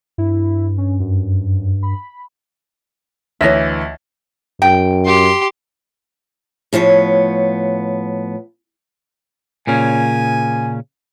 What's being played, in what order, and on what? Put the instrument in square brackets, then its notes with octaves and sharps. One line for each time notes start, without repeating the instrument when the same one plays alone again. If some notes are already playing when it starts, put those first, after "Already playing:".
[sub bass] G2 [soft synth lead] E4
[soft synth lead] C#4
F#2
B5
[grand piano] D2 E3 [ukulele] C#5 D#5 E5
[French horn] F#2 [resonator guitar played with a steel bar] G5
[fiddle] G4 C6
[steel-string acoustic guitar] A2 F3 B3 C#5
[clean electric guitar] A#2 C#3 C#4 [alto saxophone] G#5